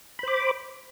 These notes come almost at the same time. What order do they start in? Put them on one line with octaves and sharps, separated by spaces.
B5 C5 D6